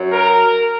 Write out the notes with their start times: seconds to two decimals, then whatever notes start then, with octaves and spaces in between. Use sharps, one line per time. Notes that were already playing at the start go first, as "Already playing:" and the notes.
Already playing: F#2 F#3
0.12 A#4